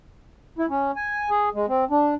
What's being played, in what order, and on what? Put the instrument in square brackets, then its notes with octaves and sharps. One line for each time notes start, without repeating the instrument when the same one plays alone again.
[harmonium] E4
C#4
G#5
G#4
G#3
C4
D4